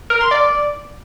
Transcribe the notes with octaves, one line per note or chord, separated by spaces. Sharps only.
A#4
C6
D5